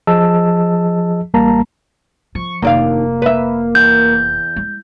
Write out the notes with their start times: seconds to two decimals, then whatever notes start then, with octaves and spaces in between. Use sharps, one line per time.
0.07 F3 G#4 D#5 A5 E6
1.34 A1 G3 A#3 A5 A#5
2.35 F3 C#6
2.62 F1 D#2 A#3 D4 F5
3.22 B4 E5
3.75 E2 G6
4.56 G#3